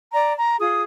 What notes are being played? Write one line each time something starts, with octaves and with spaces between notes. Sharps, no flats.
D5 A#5
A#5
F4 G#4 D#6